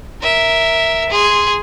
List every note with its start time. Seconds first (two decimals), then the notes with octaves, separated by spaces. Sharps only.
0.22 A#4 E5
1.10 G#4 C6